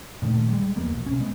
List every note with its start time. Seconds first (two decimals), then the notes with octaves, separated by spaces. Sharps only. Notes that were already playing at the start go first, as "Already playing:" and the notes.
0.22 A#2 D#3 A3
0.51 G3 G#3
0.76 E2 F3 A#3 B3
0.94 B1
1.06 C3 C#4
1.20 G#3 B3